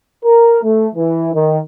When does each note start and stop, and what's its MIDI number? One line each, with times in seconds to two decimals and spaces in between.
0.24 0.58 70
0.63 0.86 57
0.95 1.31 52
1.33 1.58 51